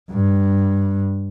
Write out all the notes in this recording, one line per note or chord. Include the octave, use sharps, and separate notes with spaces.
G2